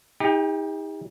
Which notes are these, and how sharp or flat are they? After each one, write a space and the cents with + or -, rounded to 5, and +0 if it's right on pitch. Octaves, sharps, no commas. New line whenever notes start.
D#4 +35 G4 +45 G5 +0